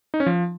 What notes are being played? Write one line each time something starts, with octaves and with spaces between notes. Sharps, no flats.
D#4
C#4
F3